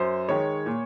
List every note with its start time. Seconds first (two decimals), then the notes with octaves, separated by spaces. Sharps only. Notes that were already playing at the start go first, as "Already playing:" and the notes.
Already playing: F#2 C5
0.29 D#3 G#3 C#5
0.66 A#2